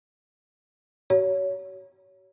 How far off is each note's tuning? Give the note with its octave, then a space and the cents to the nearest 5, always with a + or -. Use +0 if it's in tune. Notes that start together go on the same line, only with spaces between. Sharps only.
F#4 +45 C#5 +25